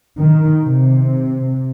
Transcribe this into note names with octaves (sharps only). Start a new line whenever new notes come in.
D#3
C3